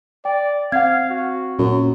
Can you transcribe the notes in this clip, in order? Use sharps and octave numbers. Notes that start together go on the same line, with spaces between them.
D5 G5
C4 F5 F#5 G#6
F#4
F#2 A#2